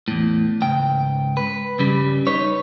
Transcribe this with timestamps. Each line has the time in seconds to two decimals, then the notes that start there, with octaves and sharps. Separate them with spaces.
0.08 E2 A2
0.61 C#2 G#2 G5
1.37 B4
1.79 G2 C#3 G3
2.27 D#4 B4 C#5